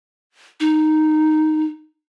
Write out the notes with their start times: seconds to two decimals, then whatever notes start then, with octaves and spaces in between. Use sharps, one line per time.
0.60 D#4